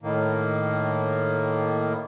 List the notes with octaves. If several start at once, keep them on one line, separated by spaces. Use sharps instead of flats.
A2 D#3 A#3